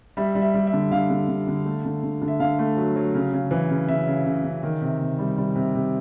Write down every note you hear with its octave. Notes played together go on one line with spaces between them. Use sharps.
G3 E5
G3
E5
G3
E5
D3
D3 F5
D3
D3
D3
A3
D3
D3
D3
E5
D3 F5
A3
F#3
F#3
C#3
C#3
E3
C#3
C#3 E5
C#3
C#3
C#3
D#3
C3
C3
G3
G3
C3
C3